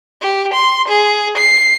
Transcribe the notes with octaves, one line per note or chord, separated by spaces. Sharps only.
G4
C6
G#4
C7